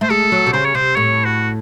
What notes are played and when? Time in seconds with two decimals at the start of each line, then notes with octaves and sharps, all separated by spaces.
0.01 A3 C5
0.10 G#3 A4
0.32 F#3
0.46 C3
0.53 C#3 C5
0.65 C#5
0.75 C3 C5
0.96 A2 C#5
1.25 F#4